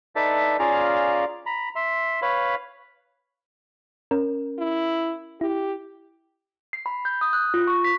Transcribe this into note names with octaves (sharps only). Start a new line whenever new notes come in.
D#4 A4 B4 D5 E5 A5
C#4 F4 G#4 D5 F5 A#5
A#5 B5
E5 C6
B4 C#5 F5 B5
C#4 A#4
E4
E4 G4
C7
B5
G6
D#6
F#6
F4
C#6
B6